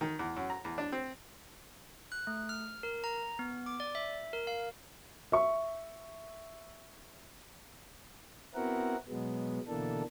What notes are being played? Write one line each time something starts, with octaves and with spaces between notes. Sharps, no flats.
D#3
E2
F#2
A#5
E2
D4
C4
F#6
A3
F6
A#4
A#5
B3
D6
D5
E5
A#4
F5
E5 C#6
B3 C4 E4 F#4 A#4 F#5
B2 F#3 G#3 B3
B2 D3 E3 A#3 D4 A4